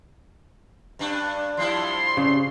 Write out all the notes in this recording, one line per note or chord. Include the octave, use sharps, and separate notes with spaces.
G2 D4
F3 G3 E4 C6
C#3